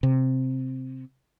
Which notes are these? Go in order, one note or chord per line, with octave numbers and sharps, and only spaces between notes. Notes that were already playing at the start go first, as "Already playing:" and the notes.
C3